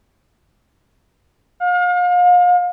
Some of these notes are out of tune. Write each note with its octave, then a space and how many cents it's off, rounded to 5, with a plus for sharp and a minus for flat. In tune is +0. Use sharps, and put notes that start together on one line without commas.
F5 +35